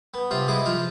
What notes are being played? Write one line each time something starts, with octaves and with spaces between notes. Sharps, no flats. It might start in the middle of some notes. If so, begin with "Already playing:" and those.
B3
C3 F4
G#3 E4 G#4
F3 F4